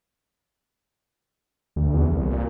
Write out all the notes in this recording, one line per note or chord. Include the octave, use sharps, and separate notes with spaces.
D2
E2
C2
A#2